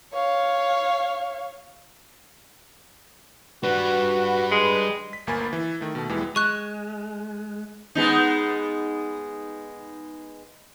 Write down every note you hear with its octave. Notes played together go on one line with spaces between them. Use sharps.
C#5 F5
G3 D4 F#4 B4
G#3
B6
G1 D2 A#3 G#5 B5 A6
E3
D#3 A3
B2 A3
E2 E3 G3 G#3 B3
G#3 C#6 F#6
G#3 B3 D#4